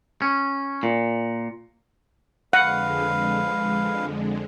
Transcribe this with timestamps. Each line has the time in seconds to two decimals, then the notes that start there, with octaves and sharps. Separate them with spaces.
0.22 C#4
0.83 A#2
2.53 F2 D3 G#3 B4 F5 F#5